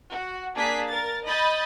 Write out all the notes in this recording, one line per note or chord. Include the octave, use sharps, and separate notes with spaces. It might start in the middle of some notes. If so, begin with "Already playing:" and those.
F#4
A#3 D4 G#4 B6
A#4 A6
D#5 B5 G6 A6